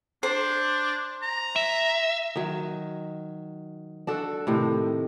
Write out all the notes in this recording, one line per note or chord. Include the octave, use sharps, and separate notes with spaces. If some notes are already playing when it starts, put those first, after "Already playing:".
D4 C5
A#5
E5
D#3 F#3
D4 F#4 A4
A2 C3 D#3